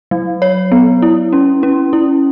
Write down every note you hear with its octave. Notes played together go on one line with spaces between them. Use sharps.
F#3
C#5
B3
E4
C#4
C#4
E4